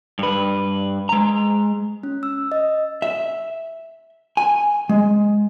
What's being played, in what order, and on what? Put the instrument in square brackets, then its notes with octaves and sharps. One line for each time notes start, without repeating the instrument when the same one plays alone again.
[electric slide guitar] G2 B4
G#3 A#5
[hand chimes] C#4
E6
D#5
[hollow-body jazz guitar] E5
G#5
G#3